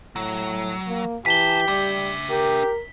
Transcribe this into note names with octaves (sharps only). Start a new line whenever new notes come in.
A2 F#3
A#3
E3 G4 G#5 A5 B6 G7
G3 D4 E5
G4 A#4